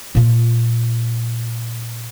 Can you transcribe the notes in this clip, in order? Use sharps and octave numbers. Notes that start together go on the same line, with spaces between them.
A#2 F4